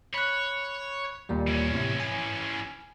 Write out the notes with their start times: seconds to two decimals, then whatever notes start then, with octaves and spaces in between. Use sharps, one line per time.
0.14 C#5 B5 F#6
1.29 D#2 A#2 G3
1.47 E3 C#4
1.71 A2 C3
2.00 G#5